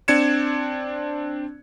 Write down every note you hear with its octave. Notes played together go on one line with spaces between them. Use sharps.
C4 D4 D5 G#6 C#7 E7